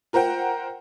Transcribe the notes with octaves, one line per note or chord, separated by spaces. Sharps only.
F4 A#4 C5 F#5 G5